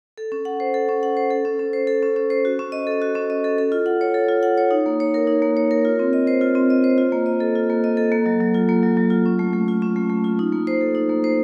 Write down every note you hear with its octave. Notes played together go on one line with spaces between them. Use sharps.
A4
C#4
F#5
C5
A4
C#4
F#5
C5
A4
C#4
C#4
C5
A4
C#4
C#4
C5
F#4
C#4
D#5
A4
F#4
C#4
D#5
A4
A4
F4
F#5
C#5
A4
F4
F#5
C#5
D#4
A#3
C#5
A#4
D#4
A#3
C#5
A#4
F4
C4
D#5
C5
F4
C4
D#5
C5
F4
A#3
D#5
A4
F4
A#3
D#5
A4
A#3
F#3
F#3
F4
A#3
F#3
F#3
F4
C#4
A3
A3
F4
C#4
A3
A3
F4
D#4
A#3
C5
A4
D#4
A#3
C5